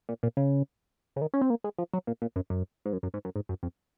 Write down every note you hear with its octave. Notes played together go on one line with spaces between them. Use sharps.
A#2
A#2
C#3
C#3
D#3
C#4
C4
A#3
G#3
F3
F#3
A#2
A#2
F#2
F#2
G#2
F#2
F#2
G#2
F#2
G#2
F#2
F2